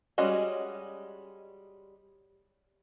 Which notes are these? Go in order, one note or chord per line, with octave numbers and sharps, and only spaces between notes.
G3 G#3 C#4 F#4 D#5